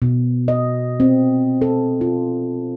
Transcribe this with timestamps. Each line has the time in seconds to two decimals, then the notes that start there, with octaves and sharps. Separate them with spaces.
0.02 B2
0.48 D#5
1.00 C4
1.62 A4
2.01 F4